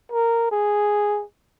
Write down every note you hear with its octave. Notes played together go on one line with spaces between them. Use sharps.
A#4
G#4